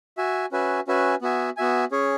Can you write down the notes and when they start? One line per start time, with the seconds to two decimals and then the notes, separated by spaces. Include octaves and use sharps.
0.17 F#4 E5 G#5
0.52 C#4 F#4 B4 E5 G#5
0.87 C#4 F#4 B4 E5 G#5
1.22 B3 F#4 E5 G#5
1.57 B3 F#4 E5 G#5
1.91 C#4 G#4 C#5